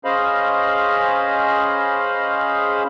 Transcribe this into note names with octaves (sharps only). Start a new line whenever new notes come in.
C#4 G#4 C5 D#5 F5 B5